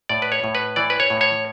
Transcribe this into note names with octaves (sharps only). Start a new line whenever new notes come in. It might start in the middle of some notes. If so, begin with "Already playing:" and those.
A2 D5
B4
C#5
A2
B4
E3 D5
B4
C#5
A2
C#5